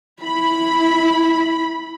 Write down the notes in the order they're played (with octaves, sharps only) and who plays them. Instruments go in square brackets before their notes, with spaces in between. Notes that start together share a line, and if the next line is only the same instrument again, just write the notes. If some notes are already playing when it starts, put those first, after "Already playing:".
[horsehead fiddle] E4 [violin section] B5